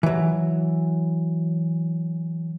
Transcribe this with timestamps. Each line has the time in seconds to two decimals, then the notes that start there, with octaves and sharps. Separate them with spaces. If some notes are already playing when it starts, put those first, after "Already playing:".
0.03 E3 F#3